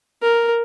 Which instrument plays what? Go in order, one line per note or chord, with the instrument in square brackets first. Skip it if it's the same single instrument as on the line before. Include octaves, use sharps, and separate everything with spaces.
[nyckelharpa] A#4